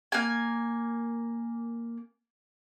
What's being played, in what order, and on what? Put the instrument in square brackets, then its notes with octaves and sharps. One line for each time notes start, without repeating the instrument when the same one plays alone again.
[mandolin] A#3 G#5